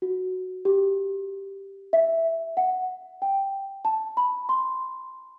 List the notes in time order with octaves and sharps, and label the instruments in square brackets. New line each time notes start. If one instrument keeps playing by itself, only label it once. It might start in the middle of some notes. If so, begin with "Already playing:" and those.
[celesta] F#4
G4
E5
F#5
G5
A5
B5
C6